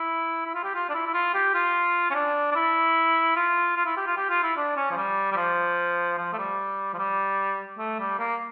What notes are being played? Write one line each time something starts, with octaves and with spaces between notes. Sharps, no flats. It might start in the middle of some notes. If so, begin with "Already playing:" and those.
Already playing: E4
E4
F4
G4
F4
D4
E4
E4
F4
G4
F4
C#4
D4
D4
E4
F4
F4
E4
G4
F4
G4
F4
E4
D4
C#4
F3
G3
G3
F3
F3
A3
G3
F3
G3
A3
G3
A#3